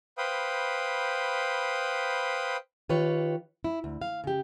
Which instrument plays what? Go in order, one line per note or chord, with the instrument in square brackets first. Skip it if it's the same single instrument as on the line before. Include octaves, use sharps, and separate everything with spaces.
[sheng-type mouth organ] B4 C5 F5 G5 B5 D#6
[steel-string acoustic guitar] D#3 F4 G4 B4 C#5
E4
D2
F5
C#3 G4